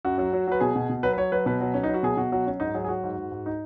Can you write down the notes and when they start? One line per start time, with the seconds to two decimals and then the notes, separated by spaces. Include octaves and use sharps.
0.05 F#2 F#4
0.18 F#3 F#4
0.33 F#3
0.47 F#3 B4
0.60 B2 G#4
0.75 B2
0.89 B2
1.03 F#3 B4
1.13 B4
1.17 F#3 C#5
1.32 F#3 B4
1.46 B2 B4
1.61 F#3
1.74 F#3 C#4
1.83 D#4
1.89 F#3
1.94 F#4
2.03 B2 G#4
2.17 B2 F#4
2.32 F#3 F#4
2.46 F#3 C#4
2.60 G#2 D#4
2.74 F#3 G#4
2.84 G#4
2.88 F#3 F#4
3.04 G#2
3.17 G#2
3.32 G#2
3.46 D#4